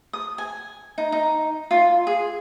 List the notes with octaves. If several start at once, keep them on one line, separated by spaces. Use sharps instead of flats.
D#6
G#5
D#4
D#4
F4
G#4